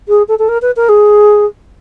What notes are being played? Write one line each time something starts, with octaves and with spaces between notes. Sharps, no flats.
G#4
A4
A4
A#4
B4
A#4
G#4